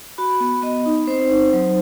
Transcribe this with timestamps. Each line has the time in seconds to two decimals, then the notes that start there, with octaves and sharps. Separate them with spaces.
0.18 F#4 B5
0.41 B3
0.62 B3 D#5
0.86 D#4
1.07 C4 C5
1.30 D#4
1.53 F#3